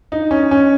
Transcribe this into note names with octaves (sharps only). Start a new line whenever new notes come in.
D#4
C#4
C#4